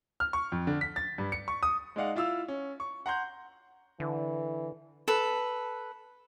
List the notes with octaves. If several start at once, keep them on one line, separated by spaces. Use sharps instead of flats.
F6
C#6
F2
D3
B6
A6
G2
C#7
C#6
D#6
G#3 D#4 D5 F5 F#5
E4 F4 F5 E6
C#4
C#6
F#5 A#5 C6 G6
D3 E3
A4 B4